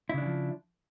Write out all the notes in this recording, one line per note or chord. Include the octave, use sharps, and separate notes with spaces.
C#3 E3 F3 D4 E4